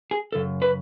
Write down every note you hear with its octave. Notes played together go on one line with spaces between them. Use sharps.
G#4
F#2 C#3 A4
B4